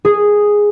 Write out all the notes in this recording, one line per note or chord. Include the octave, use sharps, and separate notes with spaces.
G#4